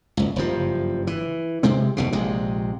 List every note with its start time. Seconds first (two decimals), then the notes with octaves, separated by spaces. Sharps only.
0.17 F#1 C#2
0.36 F#1 G2 F3
1.07 E3
1.63 C3 G#3 C4
1.97 F1 B1 B2
2.12 A#1 C3 G#3